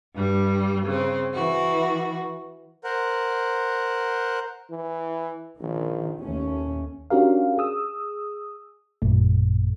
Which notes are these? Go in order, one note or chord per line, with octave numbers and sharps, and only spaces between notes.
G2 G3
C#3 C4
E3 F#4
A#4 C5 F#5
E3
A#1 D#3
A1 D#2 A3 C#4
C#4 D4 F#4 G4 A#4 F5
G#4 D#6 E6
A1 F#2 A#2 A3